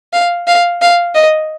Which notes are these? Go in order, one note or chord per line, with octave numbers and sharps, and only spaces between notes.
F5
F5
F5
D#5